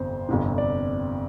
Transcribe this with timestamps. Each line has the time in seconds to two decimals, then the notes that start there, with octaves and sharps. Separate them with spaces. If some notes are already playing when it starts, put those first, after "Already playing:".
Already playing: G1 F2 C3 C5
0.29 G1 F2 C3
0.58 D5